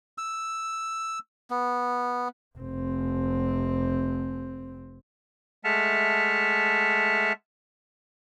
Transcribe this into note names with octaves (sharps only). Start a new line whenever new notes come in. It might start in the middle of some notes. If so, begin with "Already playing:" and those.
E6
B3
F1 C4
G#3 A3 E5 F#5 A5 F6